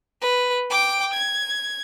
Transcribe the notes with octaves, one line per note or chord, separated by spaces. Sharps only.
B4
G5 D6
G#6